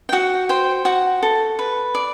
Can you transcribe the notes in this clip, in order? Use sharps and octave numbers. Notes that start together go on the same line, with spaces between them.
G5
F#4 F#5
C5 G5
F#4 F#5
A4
B4
D5